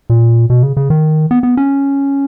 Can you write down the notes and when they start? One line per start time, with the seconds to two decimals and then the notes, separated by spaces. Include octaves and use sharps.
0.10 A#2
0.50 B2
0.63 C#3
0.77 C#3
0.90 D#3
1.31 B3
1.43 B3
1.57 C#4